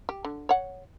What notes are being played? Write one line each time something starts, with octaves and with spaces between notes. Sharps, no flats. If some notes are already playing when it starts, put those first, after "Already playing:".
G4
D3
C#5 F#5